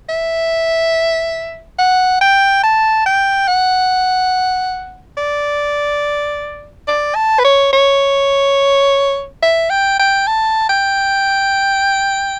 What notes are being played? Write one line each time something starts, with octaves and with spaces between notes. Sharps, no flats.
E5
F#5
G5
A5
G5
F#5
D5
D5
A5
B4
C#5
C#5
E5
G5
G5
A5
G5